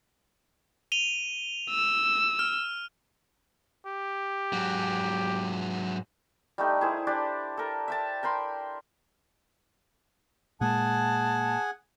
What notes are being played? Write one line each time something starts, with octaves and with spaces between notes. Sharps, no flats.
D#7 F7 G7
E6
F6
G4
G#2 F#3
G3 A3 D#4 G4
E4 G#4 C5
D4 G4 D5
A4 A#4
E5 G5 A5
A#4 G5 B5 C6
A#2 G#3 A#3 G#4 F#5 G#5 A5